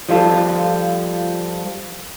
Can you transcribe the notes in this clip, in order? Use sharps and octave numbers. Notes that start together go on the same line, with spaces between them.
F3 G3 F4 A4